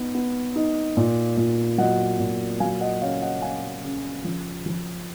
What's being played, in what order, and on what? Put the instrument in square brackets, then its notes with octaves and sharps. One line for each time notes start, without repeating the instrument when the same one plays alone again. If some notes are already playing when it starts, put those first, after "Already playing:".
Already playing: [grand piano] B3 D#4
B3
D#4
A#2
A#2
F#3 D#5 F#5
A#2
F#3 F5 G#5
D#5 F#5
C#3 C#5 F5
D#5 F#5
C#3 F5 G#5
C#3
F3
F3